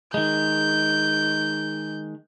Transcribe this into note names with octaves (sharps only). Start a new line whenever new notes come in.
D#3 G#3 G6